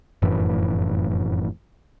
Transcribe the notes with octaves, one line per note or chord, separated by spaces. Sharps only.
F1 F#2 A2 E3